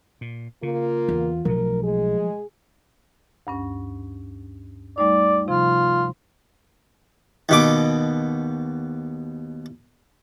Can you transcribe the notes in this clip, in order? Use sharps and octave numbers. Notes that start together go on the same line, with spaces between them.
A#2
C#3 A#3 F4
E2
B1 F3 F#3 A3 A#4
G#3 G#4
D2 G2 C#4
G3 A3 D#4 D5
C3 F3 F4
D#2 B2 D6